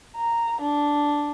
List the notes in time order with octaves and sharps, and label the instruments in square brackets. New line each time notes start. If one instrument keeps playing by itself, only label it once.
[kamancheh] A#5
D4